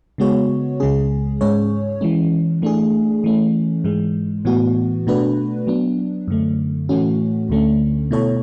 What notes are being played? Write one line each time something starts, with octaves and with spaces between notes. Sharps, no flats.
C#3 G#3 B3 F#4 C#5
C#2 C#3 G#3 C#4 G#4
G#2 G#3 C#4 G#4 C#5
E3 G#3 C#4
E3 A3 D4 G#4
E3 A3 C#4
G#2 E3 G#3
A2 E3 B3 F#4
B2 A3 D4 F#4 B4
F#3 B3 D4
F#2 D3 A3
A2 E3 A3 C#4 F#4
D2 D3 A3 C#4
B2 A3 E4 A4 C#5